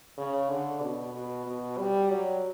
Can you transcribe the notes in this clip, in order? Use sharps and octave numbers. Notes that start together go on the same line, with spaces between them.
C#3
D3
B2
B2
B2
G3
F#3